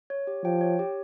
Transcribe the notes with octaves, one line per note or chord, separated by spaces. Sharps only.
C#5
G4
F3 G5
C#5
G4